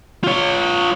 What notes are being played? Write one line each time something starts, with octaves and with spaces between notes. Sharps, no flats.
F4 C#5